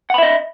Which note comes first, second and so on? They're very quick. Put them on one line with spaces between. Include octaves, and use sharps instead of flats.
F#5 B5 E5 D#5